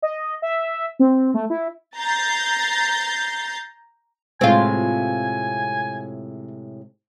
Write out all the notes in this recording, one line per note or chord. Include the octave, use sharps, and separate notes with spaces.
D#5
E5
C4
A3
E4
A#5 G6 A6 C7
A2 C3 G#3 C4 F4 G#5